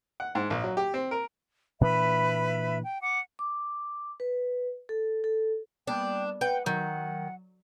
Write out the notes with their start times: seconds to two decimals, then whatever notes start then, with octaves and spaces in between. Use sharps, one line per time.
0.20 F#5
0.35 G#2
0.50 A#1
0.64 F#3
0.77 G4
0.94 C4
1.11 A#4
1.81 A#2 E3 D4 B4 E5 B5
2.83 G5
3.02 F#5 D6
3.39 D6
4.20 B4
4.89 A4
5.24 A4
5.87 G3 A#3 B3 D4 G5
6.41 B4 F#5 G5
6.66 D#3 F#3 F#5